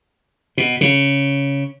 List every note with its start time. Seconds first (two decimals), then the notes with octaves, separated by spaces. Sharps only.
0.57 B2
0.81 C#3